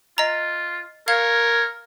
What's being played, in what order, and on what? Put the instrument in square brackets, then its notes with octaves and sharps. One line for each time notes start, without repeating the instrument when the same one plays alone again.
[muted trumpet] F4 [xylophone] D#5 A#5
[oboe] A#4 [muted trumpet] C#5 [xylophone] F5 G#6